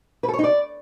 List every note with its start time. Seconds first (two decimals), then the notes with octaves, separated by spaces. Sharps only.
0.23 B4
0.28 A4
0.33 C#5
0.39 D#4
0.44 D5